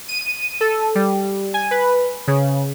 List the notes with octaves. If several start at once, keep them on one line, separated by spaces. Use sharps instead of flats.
D#7
A4
G3
G#5
B4
C#3